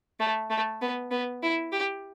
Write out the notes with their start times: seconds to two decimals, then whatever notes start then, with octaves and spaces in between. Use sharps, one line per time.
0.20 A3
0.50 A3
0.81 B3
1.11 B3
1.43 E4
1.72 G4